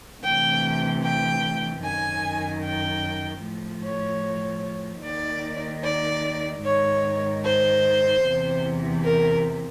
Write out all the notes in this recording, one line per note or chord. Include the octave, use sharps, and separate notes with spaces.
D2 C3 E3 G5
G5
F#2 D#3 G#5
G5
A2 F3
C#5
D#2 D#3 D5
D5
G#2 D#3 C#5
C5
E2 C3 E3
A#4